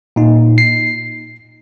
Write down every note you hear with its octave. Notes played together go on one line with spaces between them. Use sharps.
A#2 D#4
C7